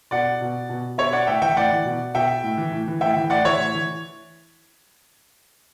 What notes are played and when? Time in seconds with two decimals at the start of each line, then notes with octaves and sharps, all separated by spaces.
0.11 B2 D5 F#5
0.41 B2
0.69 B2
0.98 B2 C#5 E5
1.13 D5 F#5
1.27 A2 E5 G5
1.42 E3 E5 G5
1.57 A2 D5 F#5
1.71 E3
1.85 B2
2.14 B2 E5 G5
2.43 A2
2.57 E3
2.72 A2
2.87 E3
3.01 A2 E5 G5
3.16 E3
3.30 A2 D5 F#5
3.44 E3 C#5 E5
3.60 A2
3.74 E3